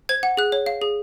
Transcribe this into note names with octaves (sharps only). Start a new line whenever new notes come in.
C5 G#6
F#5
G#4 F#6
C#5
F5
G#4